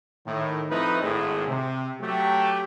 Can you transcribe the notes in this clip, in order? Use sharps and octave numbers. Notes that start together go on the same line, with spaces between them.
A2 D#3
F3 A3 C4 D#4 E4 B4
G#1 A2 G#4
C3
F#3 A3 G4